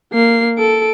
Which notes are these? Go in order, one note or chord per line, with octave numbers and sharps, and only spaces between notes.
A#3 C7
A4 D7